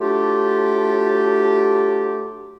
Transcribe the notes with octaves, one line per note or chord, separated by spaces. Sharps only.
F#3 A3 D4 F4 G4